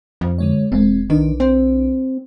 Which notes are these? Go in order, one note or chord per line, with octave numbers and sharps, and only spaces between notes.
F2
D3 G#3 C#5
E1 G#3 C4
B1 D#3 D4 B4
C4